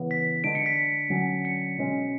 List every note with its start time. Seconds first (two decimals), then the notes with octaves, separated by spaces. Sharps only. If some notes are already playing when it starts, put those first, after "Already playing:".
Already playing: C#3 E3 B3
0.11 B6
0.44 D3 G#3 D4 D7
0.55 C#7
0.66 B6
1.10 D3 F#3 C#4
1.45 C#7
1.78 B2 G#3 C#4